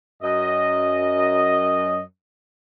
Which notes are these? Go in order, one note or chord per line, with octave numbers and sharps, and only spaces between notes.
F#2 D#5